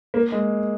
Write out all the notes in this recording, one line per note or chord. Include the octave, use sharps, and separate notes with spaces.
A#3
G#3